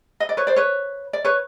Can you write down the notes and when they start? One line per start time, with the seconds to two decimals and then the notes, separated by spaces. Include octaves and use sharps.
0.20 D#5
0.29 D5
0.37 B4 C#5
0.47 C5 D5
0.56 B4 C#5
1.13 D5
1.25 B4 C#5